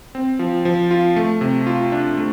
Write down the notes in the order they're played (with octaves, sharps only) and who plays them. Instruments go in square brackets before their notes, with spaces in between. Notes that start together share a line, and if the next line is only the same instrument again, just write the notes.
[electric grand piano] C4
F3
F3
F4
A3
C3
F4
D4
A3